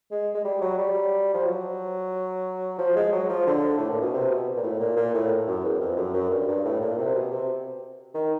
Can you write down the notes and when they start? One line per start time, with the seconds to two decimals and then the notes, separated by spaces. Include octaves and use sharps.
0.11 G#3
0.35 G#3
0.44 G3
0.61 F#3
0.78 G3
1.34 F3
1.45 F#3
2.79 F3
2.96 G#3
3.13 F#3
3.29 F3
3.46 D3
3.78 A2
3.90 A#2
4.01 B2
4.13 C3
4.30 B2
4.56 A#2
4.63 A2
4.80 A#2
4.96 A#2
5.14 A2
5.47 F#2
5.64 E2
5.80 F2
5.97 F#2
6.14 F#2
6.30 G2
6.48 G2
6.65 A2
6.81 A#2
6.98 C3
7.15 B2
7.31 C3
8.14 D#3